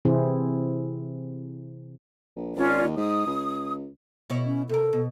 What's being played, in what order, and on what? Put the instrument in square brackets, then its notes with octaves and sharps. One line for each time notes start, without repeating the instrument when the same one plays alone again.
[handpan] C3 E3 C4 E4 G#4 C5
[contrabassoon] A#1
[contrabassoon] G#1 [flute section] C#4 F4 D5
[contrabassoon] D#2
[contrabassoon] G#2 [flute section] D#6
[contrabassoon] C#2
[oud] B2 E4 C#5
[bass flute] C#4
[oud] C3 A#4 [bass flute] A4
[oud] B2